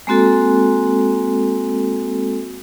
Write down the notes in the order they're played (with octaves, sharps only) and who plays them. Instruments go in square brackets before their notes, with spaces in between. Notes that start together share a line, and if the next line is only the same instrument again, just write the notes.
[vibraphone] G#3 A#3 C4 F#4 A4